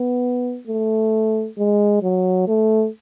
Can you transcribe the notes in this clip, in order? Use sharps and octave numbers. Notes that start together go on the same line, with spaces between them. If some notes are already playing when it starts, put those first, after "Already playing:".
Already playing: B3
A3
G#3
F#3
A3